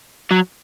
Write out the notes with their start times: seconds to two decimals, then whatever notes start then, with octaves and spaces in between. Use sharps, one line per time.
0.31 F#3